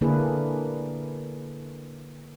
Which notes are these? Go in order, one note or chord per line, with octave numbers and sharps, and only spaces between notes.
D3 A#3 D4 E4 G#4 B4